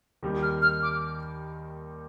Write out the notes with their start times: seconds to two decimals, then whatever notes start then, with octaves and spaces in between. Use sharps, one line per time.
0.23 D#2 D#3 G3
0.42 F6
0.62 F6
0.82 D6